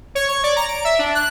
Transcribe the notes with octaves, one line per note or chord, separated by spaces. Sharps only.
C#5
C#6
D5
A#5
D7
E5
D4
F#6